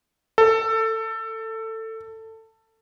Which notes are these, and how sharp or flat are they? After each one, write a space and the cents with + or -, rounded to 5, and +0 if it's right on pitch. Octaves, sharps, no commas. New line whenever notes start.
A4 +20